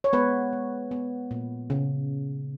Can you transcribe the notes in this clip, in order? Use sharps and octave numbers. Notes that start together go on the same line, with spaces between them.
C#5
G#3 B3 B4
G#3
B3
A#2
C#3